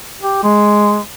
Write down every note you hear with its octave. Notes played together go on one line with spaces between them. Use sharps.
G4
G#3